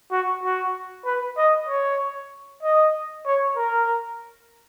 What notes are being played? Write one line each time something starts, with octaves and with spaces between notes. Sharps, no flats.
F#4
F#4
B4
D#5
C#5
D#5
C#5
A#4